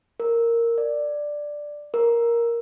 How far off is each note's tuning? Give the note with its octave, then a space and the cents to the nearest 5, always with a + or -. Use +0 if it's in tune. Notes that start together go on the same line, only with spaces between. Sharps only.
A#4 -5
D5 +5
A#4 +10